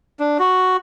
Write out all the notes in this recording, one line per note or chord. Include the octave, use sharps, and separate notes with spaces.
D4
F#4